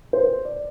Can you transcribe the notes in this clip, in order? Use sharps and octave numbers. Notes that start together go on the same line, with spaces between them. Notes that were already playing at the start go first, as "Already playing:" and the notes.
C5
D5